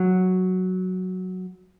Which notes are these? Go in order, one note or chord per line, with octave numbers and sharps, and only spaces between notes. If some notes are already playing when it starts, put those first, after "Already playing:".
Already playing: F#3